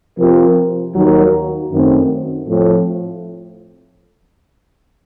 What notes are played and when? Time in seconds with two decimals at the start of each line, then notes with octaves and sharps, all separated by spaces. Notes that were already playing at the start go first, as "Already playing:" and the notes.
0.18 C3 F3 C4 F4 A#4
0.95 D#2 D#3 F#3
1.72 F#2 D#3 A3 C4
2.48 A2 F3 C4